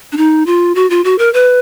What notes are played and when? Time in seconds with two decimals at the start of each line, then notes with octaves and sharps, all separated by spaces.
0.12 D4
0.17 D#4
0.46 F4
0.75 F#4
0.90 F4
1.04 F#4
1.19 A#4
1.34 B4